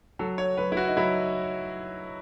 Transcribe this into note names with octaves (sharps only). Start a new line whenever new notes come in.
F#3 A4
C#5
F#3 B4
E4
F#4
D#4
F#3 E4